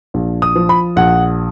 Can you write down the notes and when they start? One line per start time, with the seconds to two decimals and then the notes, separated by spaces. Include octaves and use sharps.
0.14 A#1
0.42 D#6
0.56 F3
0.69 B5
0.96 A#1 F#5